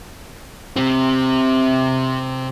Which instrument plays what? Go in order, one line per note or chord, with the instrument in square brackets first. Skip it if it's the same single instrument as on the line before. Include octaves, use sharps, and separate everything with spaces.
[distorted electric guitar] C3 C4